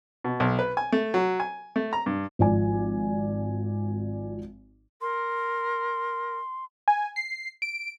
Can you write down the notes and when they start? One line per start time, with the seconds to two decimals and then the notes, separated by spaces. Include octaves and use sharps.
0.24 B2
0.40 B1
0.59 B4
0.77 G#5
0.92 A3
1.14 F#3
1.40 G#5
1.76 A3
1.93 A#5
2.06 G2
2.39 G#1 F3 D5 G#5
5.01 A#4 C6
6.88 G#5
7.16 C7
7.62 D7